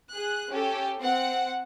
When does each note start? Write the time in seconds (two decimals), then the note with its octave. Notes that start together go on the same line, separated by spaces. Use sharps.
0.12 G#4 F#6
0.50 C#4 G4 A4
1.00 C4 F#5